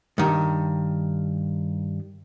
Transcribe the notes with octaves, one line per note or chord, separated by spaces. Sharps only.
G2 D#3